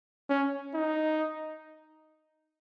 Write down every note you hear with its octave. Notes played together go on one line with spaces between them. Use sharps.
C#4
D#4